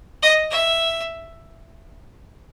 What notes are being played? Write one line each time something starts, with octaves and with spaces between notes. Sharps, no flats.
D#5
E5